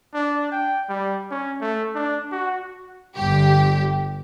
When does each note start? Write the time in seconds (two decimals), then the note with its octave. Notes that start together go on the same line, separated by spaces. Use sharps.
0.14 D4
0.52 G5
0.89 G3
1.31 C#4
1.61 A3
1.95 D4
2.32 F#4
3.16 G1 G2 G4